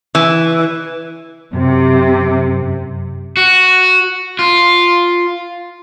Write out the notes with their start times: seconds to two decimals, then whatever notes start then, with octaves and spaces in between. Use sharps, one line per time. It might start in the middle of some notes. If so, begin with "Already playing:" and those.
0.15 E3
1.53 F#2 C3
3.37 F#4
4.39 F4